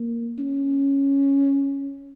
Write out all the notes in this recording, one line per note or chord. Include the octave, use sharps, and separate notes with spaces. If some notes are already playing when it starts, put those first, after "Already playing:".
Already playing: A#3
C#4